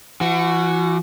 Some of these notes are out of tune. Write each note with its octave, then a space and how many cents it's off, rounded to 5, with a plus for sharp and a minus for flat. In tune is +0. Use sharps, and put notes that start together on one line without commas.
E3 +40 F#4 -5